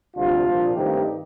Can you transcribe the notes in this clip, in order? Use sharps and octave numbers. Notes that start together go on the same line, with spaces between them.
D2 C3 G3 D4 F4
C2 A#2 F3
G2 D#3 A3 C4 D#4 G4